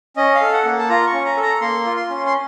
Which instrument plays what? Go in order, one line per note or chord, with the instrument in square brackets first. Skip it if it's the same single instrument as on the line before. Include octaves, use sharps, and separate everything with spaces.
[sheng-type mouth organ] C#4 D#5
F5
A4
F#5
A#3
A5
F4 A#5
C#6
C#4
A#5
A4
A#5
A#3 C6
F4
C6
C#4
C6